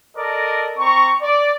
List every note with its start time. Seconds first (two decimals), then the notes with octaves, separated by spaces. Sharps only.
0.17 A4 A#4 D5 D#5
0.79 C4 A#5 C#6
1.22 D5